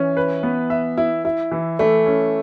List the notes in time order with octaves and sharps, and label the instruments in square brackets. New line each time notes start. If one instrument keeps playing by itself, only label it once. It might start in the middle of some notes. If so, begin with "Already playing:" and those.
Already playing: [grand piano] E3 [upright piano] C#4
[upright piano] B4
B3
E5
E4
E4
E3
[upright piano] E3 [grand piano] A3
[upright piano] C#4